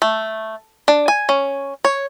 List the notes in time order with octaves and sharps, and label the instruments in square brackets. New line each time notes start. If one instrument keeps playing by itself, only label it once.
[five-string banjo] A3
D4
G#5
C#4
C#5